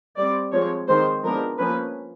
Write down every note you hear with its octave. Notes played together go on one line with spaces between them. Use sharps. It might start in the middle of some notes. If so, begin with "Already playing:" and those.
G3 C4 D5
F3 G#3 C4 C#5
D#3 G#3 C4 C5
F3 G#3 B3 D4 A#4
F3 A#3 C#4 B4